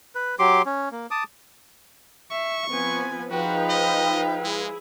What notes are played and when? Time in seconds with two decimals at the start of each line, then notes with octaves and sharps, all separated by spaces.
0.15 B4
0.39 F#3 G4 C6 D6
0.66 C#4
0.92 A#3
1.11 A5 D6 D#6
2.31 E5 C#6
2.70 F3 B3 C4 B4 G#5
3.31 F3 D#4 F#4 G#4 B4 F5 G5
3.70 D#5
4.44 G#3 E4 G#4